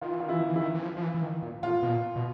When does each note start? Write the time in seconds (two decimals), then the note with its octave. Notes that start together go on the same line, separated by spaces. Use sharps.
0.01 D#3 F4
0.12 E3
0.20 D#3 F4
0.29 E3 E4
0.41 D#3
0.50 E3
0.56 D#3 E4
0.75 E3
0.82 F3
0.97 F3
1.02 E3
1.15 E3
1.23 D#3
1.43 A#2
1.63 A2 F4
1.83 B2
1.89 A#2
2.16 B2